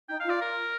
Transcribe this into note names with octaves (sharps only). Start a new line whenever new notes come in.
D#4 G5
F5
F4 D5
A#4